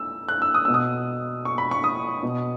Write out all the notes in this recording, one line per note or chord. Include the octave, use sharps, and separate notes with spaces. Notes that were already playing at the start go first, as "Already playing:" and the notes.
Already playing: E6
F#6
E6
D#6
B2 E6
D#6
C#6
B5
C#6
D#6
B2